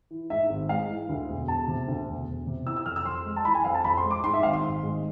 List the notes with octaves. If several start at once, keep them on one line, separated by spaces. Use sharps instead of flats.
E3
G#2 E5
G#1
G#3 F5
E3
D2
E1
E1 A5
C3
D2
E1
E1
C3
E3 E6
E6
F2 F6
E6
F2 C6
G#3
A5
E3 B5
G#5
F2 F5
A5
F2 B5
C6
G#3
D6
G#2 C6
E5
G#1 F5
C6
G#1
G#3